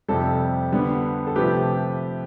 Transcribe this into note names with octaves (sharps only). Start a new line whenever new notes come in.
F2 C3 G3 A4
D3 G3 B3
A4
C3 F3 A3 G4 B4